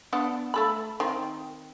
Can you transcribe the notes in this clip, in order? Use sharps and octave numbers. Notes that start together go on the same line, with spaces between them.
B3 D4 F#5
A3 A4 B5
D#3 C4